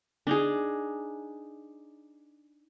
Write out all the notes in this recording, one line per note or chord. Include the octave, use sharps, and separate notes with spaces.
D4 D#4 G#4